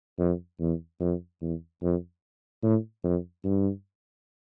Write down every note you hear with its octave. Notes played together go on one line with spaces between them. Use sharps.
F2
E2
F2
E2
F2
A2
F2
G2